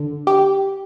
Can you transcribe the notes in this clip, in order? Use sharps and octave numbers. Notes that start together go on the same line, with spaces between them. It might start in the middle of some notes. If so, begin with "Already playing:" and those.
Already playing: D3
G4